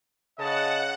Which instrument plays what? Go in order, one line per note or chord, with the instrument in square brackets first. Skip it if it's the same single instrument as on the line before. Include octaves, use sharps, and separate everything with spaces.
[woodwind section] C#3 [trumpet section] D#5 A5 [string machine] F#5